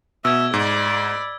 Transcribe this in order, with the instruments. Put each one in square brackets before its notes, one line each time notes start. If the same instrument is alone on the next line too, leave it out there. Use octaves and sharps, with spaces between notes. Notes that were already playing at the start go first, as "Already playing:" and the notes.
[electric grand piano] B2 [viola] E5 [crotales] E6 G#6
[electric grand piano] G#2 [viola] D5 B5